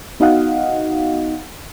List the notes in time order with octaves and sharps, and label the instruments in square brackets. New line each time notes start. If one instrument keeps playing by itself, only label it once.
[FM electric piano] B3 D#4 F#4 D#5 F5 F#5